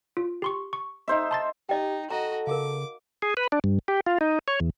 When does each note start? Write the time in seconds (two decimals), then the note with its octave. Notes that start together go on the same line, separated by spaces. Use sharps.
0.17 F4
0.42 G4 C6 C#6
0.73 C#6
1.08 D#4 C5 E5
1.31 A5 C6 A6
1.69 D#4 G4 D#5 G5
2.11 F#4 A4 D#5 A#5
2.47 C#3 A#4 F5 D6
3.22 G#4
3.37 B4
3.52 D4
3.64 G2
3.88 G4
4.06 F4
4.21 D#4
4.48 C#5
4.60 E2